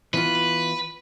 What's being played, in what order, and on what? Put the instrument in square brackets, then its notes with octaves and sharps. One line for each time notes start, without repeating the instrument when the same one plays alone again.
[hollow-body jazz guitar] E3 B3 F4 [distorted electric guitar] B4